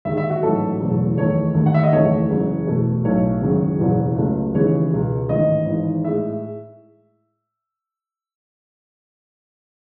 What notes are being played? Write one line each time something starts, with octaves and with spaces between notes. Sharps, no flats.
D#2 D#3 G#3 E5
E5
F#4
A1 G#2 F#3 A4
F#1 E2 B2 F#3 A3
E2 D#3 A3 C#5
D#2 D#3 A3
F#5
E5
D#5
F#1 E2 D#3 A3 C#5
F#1 F#2 E3 G#3
E2 B2 A3
B1 A2 F#3 A3 C#5
F#1 F#2 D#3 G#3
F#1 E2 B2
C#2 C#3 F#3 A3
D#2 C#3 E3 G#3 C#5
C#2 B2 G#3
A1 G#2 D#3 D#5
G#1 G#2 E3
A2 G#3 E5